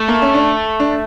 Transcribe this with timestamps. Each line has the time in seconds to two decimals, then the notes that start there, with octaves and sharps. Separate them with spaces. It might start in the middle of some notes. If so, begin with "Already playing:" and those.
Already playing: A3
0.08 A#3
0.22 C#4
0.35 D4
0.80 D4